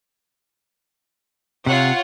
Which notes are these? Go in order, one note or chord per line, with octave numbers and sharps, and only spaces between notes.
C3 F4 C#5 F#5